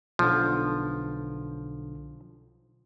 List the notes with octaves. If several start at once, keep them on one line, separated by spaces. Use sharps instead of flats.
B1 D3 F3